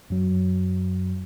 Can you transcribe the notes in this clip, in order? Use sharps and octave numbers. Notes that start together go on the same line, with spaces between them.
F#2 F#3